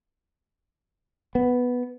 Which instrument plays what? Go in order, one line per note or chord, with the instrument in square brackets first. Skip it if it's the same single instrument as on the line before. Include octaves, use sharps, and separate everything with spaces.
[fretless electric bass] B3